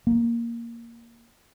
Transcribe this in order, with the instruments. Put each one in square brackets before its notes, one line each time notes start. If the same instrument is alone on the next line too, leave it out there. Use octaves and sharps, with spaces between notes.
[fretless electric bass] A#3